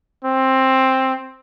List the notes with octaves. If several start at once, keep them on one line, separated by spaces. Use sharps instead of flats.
C4